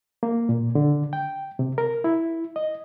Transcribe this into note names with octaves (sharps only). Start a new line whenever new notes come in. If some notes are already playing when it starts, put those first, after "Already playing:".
A#3
A#2
D3
G5
C3
A#4
E4
D#5